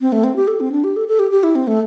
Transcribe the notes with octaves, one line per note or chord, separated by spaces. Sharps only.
C4
A3
C4
G4
A4
C4
D4
G4
A4
A4
G4
G4
E4
C4
A3